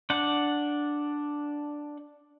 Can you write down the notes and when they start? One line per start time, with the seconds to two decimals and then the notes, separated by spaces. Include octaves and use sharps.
0.10 D4 F#5